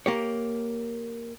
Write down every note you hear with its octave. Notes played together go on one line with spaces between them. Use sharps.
A#3 G4 C#5